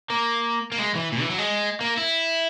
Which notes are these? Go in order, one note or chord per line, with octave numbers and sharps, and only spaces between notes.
A#3
A#3
G#3
E3
A#2
E3
F#3
G#3
A#3
E4